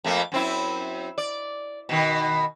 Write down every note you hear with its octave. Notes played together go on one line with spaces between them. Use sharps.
F2 A3 A#3
F#2 C4 E4
D5
B2 D#3